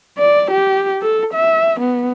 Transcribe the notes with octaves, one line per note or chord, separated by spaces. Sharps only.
D5
G4
A4
E5
B3